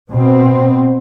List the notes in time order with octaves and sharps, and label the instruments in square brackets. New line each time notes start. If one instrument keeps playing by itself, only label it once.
[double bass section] B2 C4